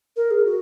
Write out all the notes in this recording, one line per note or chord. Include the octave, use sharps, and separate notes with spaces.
A#4
G#4
F#4